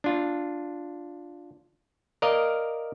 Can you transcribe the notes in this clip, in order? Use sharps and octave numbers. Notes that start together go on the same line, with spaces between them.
D4 F4
A#4 D5 D#5 F5